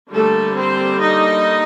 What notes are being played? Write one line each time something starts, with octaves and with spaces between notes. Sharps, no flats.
D3 G3 A3 A#3 A4
C4 C5
D#4 D#5